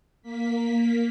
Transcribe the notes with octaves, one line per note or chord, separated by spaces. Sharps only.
A#3 B6